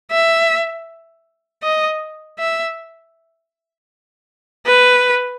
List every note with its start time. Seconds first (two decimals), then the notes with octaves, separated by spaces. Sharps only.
0.11 E5
1.63 D#5
2.39 E5
4.66 B4